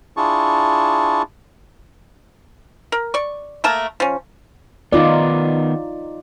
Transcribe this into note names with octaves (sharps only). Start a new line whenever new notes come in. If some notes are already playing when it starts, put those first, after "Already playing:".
D4 E4 F4 G#4 A5 C#6
A#4
D5 C#6
A3 A#3 A#4 A5
F3 C#4
D#3 B3 D#4 F4 D5